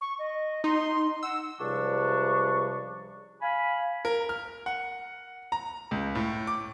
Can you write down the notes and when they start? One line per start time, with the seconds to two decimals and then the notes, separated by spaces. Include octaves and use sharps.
0.01 C#6
0.18 D#5
0.64 D#4 C6
1.23 F#5 E6
1.60 C#2 C3 F3 G3 D4 C#6
3.42 F5 G#5 B5
4.05 A#4
4.29 F6
4.66 F#5
5.52 A#5
5.91 C#2
6.15 A2
6.47 D6